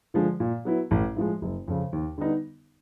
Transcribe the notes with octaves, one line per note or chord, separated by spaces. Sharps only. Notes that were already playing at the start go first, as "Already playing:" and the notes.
D3 F3 G#3
A#2
F#3 B3 E4
A1
A2 F3 G#3
F#1
F2 C#3
D#2
D3 G3 B3 D#4